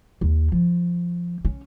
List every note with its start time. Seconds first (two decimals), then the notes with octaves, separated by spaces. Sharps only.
0.21 D#2
0.52 F3
1.45 C#4